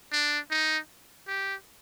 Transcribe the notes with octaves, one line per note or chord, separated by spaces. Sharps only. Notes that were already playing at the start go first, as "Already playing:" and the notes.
D4
D#4
G4